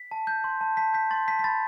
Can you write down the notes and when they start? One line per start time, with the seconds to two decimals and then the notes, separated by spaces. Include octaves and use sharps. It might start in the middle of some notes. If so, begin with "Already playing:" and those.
Already playing: B6
0.11 A5
0.27 G6
0.44 C6
0.61 A5
0.77 A5 B6
0.94 G6 B6
1.11 C6 A6
1.28 A5 B6
1.39 B6
1.44 B5 A6